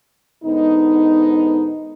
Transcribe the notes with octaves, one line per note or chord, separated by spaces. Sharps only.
G#2 D3 B3 D#4